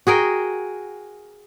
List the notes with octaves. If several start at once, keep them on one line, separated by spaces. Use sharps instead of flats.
F#4 G#4 A#4 G5